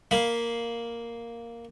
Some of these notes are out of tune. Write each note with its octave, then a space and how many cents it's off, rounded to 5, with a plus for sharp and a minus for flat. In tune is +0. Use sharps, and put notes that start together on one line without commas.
A#3 +0 F5 +0 B5 -10